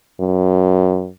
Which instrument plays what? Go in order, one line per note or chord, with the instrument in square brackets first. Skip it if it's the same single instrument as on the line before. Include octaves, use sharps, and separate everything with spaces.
[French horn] F#2